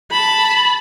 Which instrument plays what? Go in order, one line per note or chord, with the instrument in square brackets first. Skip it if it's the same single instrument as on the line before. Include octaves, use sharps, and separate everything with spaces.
[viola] A5 B5